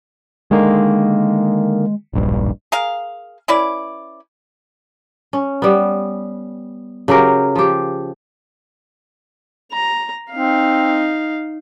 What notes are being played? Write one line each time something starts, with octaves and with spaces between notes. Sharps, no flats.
D3 D#3 G#3 A#3
D1 A#1 G2
G#4 A#4 F5
C#4 E4 B4 D5
C#4
G3 B3
C#3 F#3 G4 A#4
F3 G4
A#5
C4 D#4 F5